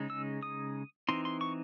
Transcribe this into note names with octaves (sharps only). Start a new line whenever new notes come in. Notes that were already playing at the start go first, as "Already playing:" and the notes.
Already playing: C#3 G#3 D#4
E6
D#6
E3 C4 D#4 C6
C6
C#6